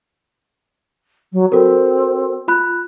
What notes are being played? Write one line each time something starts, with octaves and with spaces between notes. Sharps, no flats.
F#3
C4 F#4 A4 A#4
F4 B5 F#6